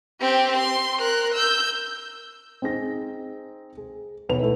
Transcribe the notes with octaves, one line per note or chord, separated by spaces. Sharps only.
C4 G4
C6
A#4 F#6
E6 G6
C4 D#4 G#4 A#6
G#4
B1 B2 B4 F7
A3 E4